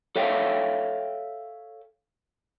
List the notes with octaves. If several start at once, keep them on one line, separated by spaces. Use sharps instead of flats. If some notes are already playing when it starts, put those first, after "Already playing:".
A4 C#5 E5 F5 G5